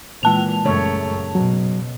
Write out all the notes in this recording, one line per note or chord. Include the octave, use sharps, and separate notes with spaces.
A#2 E3 G#3 A5 F7
F#2 C#3 A3 C#5
B2 F#3